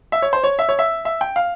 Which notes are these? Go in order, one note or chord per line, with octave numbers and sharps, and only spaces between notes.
E5
C#5
C5
C#5
E5
C#5
E5
E5
G5
F5